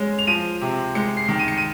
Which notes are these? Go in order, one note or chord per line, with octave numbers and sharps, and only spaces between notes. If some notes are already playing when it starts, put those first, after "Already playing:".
Already playing: G#3 C#4
F7
F3 D#7
C3
G#3 C#7
C7
D#3
D#7
C#7
D#7